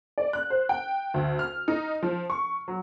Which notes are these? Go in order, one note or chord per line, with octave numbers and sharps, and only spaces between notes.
D5
F#6
C5
G5
D2
F6
D#4
F3
C#6
F#3